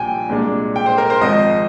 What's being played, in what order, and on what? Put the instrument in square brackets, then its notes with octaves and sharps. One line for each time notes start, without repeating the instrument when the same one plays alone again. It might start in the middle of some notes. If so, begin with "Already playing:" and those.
Already playing: [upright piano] C2 A#2 F3 G5 G#5
C2 A#2 G#3 D4
G5
C5
A#4
C5
G#1 G#2 F3 C4 D#5